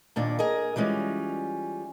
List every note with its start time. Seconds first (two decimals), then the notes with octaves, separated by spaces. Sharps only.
0.16 D#2 A#2 D4
0.39 G#4 A#4 D#5
0.76 E3 G3 G#3 C#4 F4